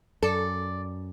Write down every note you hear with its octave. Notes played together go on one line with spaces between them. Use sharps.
F#2 A4 D5